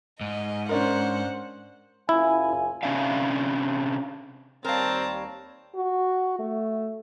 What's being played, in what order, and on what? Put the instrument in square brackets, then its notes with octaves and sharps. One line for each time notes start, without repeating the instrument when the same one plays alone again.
[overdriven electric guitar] G#2 [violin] D#5
[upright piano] C#4 D4 A#4 [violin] C5 F#5
[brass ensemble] F#1 F4 G#5 [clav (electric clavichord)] E4
[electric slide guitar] C3 D#3 C#4 D4 E5 F5
[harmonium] D#2 G3 C#5 [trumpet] C4 [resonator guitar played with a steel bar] A#4 F5 [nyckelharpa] A5 A#5
[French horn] F#4
A3